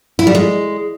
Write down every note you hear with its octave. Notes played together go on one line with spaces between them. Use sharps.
E4
G3
G#3